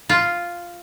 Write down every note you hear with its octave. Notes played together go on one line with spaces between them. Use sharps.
F4